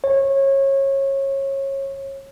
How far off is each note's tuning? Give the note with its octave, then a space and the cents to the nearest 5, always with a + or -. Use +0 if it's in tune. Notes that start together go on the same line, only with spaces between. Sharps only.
C#5 -25